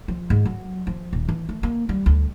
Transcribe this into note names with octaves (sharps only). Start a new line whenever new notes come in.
F3
G#2
F#3
F3
D#1
E3
A3
A#3
G3
D2